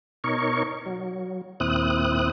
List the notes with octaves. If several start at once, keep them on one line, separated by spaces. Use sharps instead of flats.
B2 D#4 A#4 C#5 C#6
F#3
D#2 A#2 C4 E4 D#6 F#6